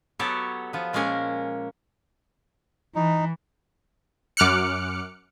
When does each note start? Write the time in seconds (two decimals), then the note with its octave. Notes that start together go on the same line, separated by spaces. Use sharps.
0.19 F#3 B3 F#4 G4 A4 C#5
0.73 F3 B3
0.93 A#2 G#3 A#3 C#4 A#4
2.95 E3 D#4
4.37 F#2 D6 F6 F#6 C#7